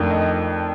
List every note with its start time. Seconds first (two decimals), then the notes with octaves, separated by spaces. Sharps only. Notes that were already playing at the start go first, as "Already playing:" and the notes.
Already playing: F2 D#3 A3 D4 F4
0.11 D#5
0.21 D#5